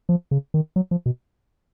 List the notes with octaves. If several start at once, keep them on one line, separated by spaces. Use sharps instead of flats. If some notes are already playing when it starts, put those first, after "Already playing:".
F3
C#3
D#3
F#3
F3
B2